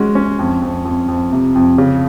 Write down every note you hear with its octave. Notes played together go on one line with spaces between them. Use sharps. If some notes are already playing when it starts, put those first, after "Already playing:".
Already playing: G#3 C#4 F#4
C#4
F2
F2
F2
F2
C3
F2
C#3